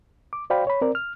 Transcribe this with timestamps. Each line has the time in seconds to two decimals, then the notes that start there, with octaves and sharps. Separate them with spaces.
0.33 D6
0.50 F#4 C5 D5 F5 G5 B5
0.67 C#5 B5
0.81 C4 A#4 D5
0.95 F6